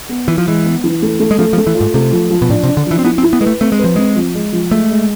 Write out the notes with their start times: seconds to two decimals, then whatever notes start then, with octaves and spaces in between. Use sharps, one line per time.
0.09 B3
0.27 E3 E4
0.38 F3
0.47 E3 G#3
0.65 B3
0.84 E3
1.02 A3
1.19 A3
1.31 G#3
1.39 F3 A3
1.53 F3
1.57 A3
1.67 E3
1.75 F4
1.81 G#2
1.94 C3 A3
2.12 F3
2.30 F3
2.42 B2
2.49 A2 D4
2.63 C3
2.69 D4
2.77 D3
2.87 E3 F3
2.99 C4
3.05 B3 E4
3.18 C4
3.23 E4
3.33 B3
3.41 G#3 B4
3.46 A3
3.61 A3 C4
3.72 G#3
3.79 F3 B4
3.96 G#3 C4
4.16 F3
4.34 G#3
4.53 F3
4.71 G#3 A3
4.90 G#3